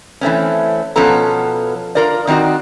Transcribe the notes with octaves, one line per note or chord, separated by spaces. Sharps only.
E3 A3 C4 C#4
B2 F3 B3 C#4 A4 A#5
F4 A#4 D5
D#3 C4 D#4 F#4 D5